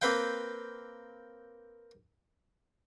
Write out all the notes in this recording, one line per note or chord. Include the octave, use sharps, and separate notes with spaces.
A#3 C4 B4 F5 G5